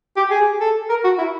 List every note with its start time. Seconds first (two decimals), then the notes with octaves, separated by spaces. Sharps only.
0.17 G4
0.31 G#4
0.60 A4
0.90 A#4
1.04 F#4
1.18 E4